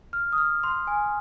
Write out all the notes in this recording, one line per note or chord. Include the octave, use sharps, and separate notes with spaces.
F6
D#6
F6
C6
G#5